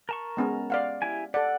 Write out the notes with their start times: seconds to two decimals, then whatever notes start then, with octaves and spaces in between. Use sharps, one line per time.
0.09 A#4 A5 C#6
0.37 G#3 B3 C#4
0.70 D5 F5 F#5
1.02 E4 G4 G#5
1.34 A4 D5 F#5